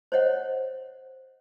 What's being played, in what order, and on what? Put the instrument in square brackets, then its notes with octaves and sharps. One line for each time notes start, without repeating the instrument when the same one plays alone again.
[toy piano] C5 C#5 D#5 F#5